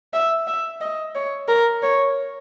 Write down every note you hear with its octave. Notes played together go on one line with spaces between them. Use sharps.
E5
E5
D#5
C#5
A#4
C#5